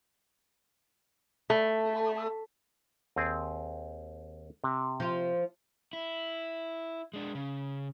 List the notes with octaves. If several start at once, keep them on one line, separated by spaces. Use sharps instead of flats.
A3
D#2 C4 G#4
C3
F3 F4
E4
G#3 D4
C#3